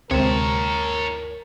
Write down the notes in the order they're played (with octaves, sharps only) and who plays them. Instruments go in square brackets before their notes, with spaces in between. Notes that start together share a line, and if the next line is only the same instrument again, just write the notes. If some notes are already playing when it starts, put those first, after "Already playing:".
[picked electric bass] D2 G#3 [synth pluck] C3 [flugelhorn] A#4 [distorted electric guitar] C#5 A5